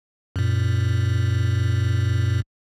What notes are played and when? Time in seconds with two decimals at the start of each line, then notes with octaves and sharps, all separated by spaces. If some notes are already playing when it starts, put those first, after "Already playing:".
0.36 F#2 A#2